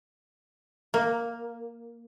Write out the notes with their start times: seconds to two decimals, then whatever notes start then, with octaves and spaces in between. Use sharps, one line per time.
0.94 A#3